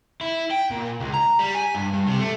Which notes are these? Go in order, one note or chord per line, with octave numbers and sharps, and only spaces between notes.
E4
G5
A#2
C#2
A#5
G3
G#5
G2
G2
C3
A3